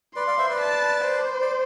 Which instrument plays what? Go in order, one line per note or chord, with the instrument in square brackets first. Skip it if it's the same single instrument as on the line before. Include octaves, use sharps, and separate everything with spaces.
[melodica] B4 D5 [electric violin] C6
[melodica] D5 F5
C5 E5
B4 D5
[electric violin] A5
C5
[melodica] D5